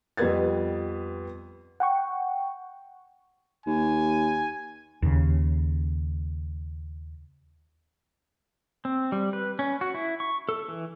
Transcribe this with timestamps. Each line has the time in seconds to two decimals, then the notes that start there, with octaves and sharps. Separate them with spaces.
0.17 F2 G3 B3 B4 G#6 A6
1.80 F#5 G5 C#6
3.66 D#2 G#5
5.02 D#2 C#3
8.85 C4
9.12 G3
9.33 B4
9.59 C#4
9.81 F#4
9.94 E4
10.20 C#6
10.49 A4
10.68 E3